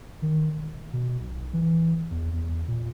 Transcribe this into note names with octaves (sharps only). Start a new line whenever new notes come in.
D#3
E1
B2
B1
E3
E2
E2
A#2